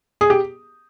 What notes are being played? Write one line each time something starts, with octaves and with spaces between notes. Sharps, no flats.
G#4
G4